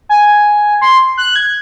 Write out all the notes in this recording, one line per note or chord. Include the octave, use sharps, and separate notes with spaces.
G#5
C6
F#6
G#6